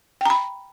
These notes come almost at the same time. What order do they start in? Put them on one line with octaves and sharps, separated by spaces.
G5 A#5 B5